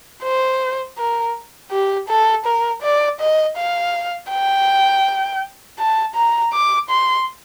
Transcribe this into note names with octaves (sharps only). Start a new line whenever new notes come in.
C5
A#4
G4
A4
A#4
D5
D#5
F5
G5
A5
A#5
D6
C6